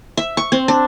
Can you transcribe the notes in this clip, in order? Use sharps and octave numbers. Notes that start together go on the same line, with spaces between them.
E5
C#6
C4
D4